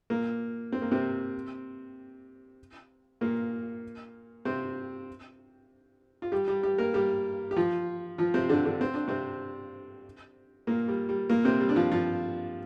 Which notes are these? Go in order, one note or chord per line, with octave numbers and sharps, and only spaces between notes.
A#2 A#3
C4
A#3
C3 C4
A#2 A#3
C3 C4
F4
G3 G4
G3 G4
G3 G4
A#3 A#4
G3 G4
G4
F3 F4
F3 F4
C3 C4
D3 D4
D3 D4
C4
D4
C3 C4
A#2 A#3
G3
G3
A#2 A#3
C3 C4
G3
D4
F3 F4
F3 F4